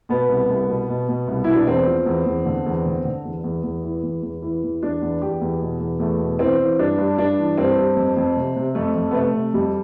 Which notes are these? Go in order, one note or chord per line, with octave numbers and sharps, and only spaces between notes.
B2 B3
C2
C2
B2
B2
B2
C2
B2 E4
D4
E2 C4
F3
E2
E2
D3
E2
D3
D3
E2
E2
E2
E3
E2
E2
E3
E2
E2 D4
E2
E2 G4
E2
B2
E2
E2 A3
B2
E3 C4
E3
G2 D4
G2
G2 D4
E3
G2 C4
G2
F2
F2
C3
C3
F2 A3
F2
B3
C3 A3
C3
F2 G3